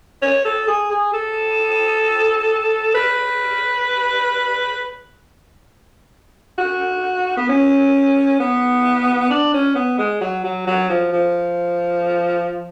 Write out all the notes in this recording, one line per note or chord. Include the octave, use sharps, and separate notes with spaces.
C#5
A4
G#4
G#4
A4
B4
F#4
B3
C#4
B3
D4
C#4
B3
G#3
F#3
F#3
F#3
F3
F3